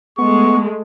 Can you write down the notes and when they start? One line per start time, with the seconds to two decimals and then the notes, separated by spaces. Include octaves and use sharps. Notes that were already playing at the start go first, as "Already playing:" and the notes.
0.18 G#3 A3 B3 C#6